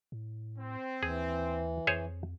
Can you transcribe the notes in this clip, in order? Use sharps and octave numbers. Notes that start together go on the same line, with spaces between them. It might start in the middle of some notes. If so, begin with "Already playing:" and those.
A2
C4
D#2 E3 G#4
F2 G#4 C5 C#5